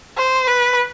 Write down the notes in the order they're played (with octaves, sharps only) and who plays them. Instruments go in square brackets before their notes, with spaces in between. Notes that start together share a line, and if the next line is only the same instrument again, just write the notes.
[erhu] C5
B4